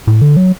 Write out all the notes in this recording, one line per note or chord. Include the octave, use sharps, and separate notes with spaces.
A2
D3
F#3